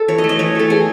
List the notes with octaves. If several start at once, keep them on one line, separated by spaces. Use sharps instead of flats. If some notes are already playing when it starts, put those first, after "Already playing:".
Already playing: A4
E3 C#5
D#5
A3
D#5
E3 C#5
A3 A4
E3 G#4